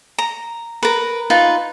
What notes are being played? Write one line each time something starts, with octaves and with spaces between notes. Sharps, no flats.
A#5
A#4 B4
D#4 F4 B4